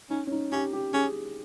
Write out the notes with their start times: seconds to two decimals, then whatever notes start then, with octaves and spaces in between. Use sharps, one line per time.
0.10 C#4 D#4
0.27 C#4
0.32 D#4
0.52 C#4 G4
0.73 G4
0.94 C#4 G#4